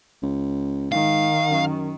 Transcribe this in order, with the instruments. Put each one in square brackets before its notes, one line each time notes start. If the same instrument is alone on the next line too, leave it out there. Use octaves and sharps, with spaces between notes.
[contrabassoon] C#2
[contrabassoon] G#2 [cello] D#3 [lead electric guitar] F5
[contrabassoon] F#2